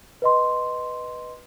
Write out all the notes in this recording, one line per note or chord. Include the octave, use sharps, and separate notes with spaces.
B4 D#5 C6